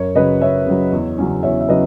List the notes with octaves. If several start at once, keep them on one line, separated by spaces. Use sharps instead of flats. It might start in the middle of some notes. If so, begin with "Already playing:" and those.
Already playing: F#2 A#4 C#5
C#3 F#3 B4 D#5
F#2 C#5 E5
C#3 F#3
E2
C#3 F#3 C#4
E2 C#5 E5
E5
C#3 F#3 C#4 B4 D#5